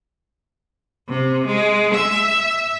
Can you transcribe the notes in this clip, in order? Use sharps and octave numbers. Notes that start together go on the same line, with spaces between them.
C3
G#3
E5